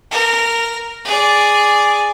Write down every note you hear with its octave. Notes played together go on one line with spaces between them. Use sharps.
A#4
G#4 D5